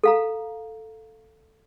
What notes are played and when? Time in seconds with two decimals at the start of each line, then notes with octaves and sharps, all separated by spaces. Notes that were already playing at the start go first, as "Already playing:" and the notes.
0.04 A4 F5 A#5